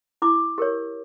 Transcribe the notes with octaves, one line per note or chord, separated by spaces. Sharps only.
E4 D6
G4 A#4 C#5